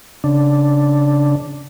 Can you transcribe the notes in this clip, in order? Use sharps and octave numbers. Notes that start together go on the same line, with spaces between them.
C#3 D4